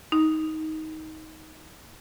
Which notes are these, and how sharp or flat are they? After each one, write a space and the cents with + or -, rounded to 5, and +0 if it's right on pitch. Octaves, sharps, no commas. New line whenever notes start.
D#4 +15